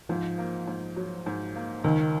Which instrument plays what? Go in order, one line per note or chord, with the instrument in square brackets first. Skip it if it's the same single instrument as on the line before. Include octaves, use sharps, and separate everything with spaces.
[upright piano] G#2 [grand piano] F3
[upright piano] A#3
G#2
F#3
G#2
A#3
[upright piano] C#2 [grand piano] D#3